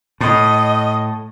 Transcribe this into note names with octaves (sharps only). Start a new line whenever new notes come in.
A2 D#5